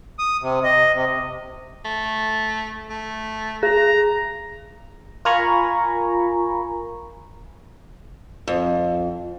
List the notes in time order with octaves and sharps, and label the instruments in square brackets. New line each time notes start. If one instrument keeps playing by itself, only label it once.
[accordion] D#6
C3
D#5
C3
[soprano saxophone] A3
A3
[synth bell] G#4 [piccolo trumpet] A#5
[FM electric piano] F4 A#4 G#5 A#5 B5 C#6
[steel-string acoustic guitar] F2